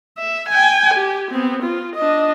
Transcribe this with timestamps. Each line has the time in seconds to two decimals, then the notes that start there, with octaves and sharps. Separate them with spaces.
0.18 E5
0.49 G5 G#5
0.94 G4
1.31 B3 C4
1.62 F4
1.96 D4 D#5